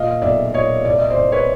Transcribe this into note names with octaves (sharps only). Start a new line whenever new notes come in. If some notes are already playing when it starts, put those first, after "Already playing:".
Already playing: A#2 D#5 F5
B1 D5 E5
A#2 C#5 D#5
C2 D5
D#5
C5 D5
C2
B4 C#5